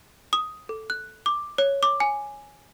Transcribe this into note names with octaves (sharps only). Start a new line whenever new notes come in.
D#6
A4
F#6
D6
C#5
D6
G#5